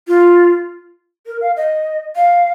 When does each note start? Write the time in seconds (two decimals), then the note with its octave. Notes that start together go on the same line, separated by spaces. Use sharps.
0.08 F4
1.27 A#4
1.41 F5
1.57 D#5
2.16 F5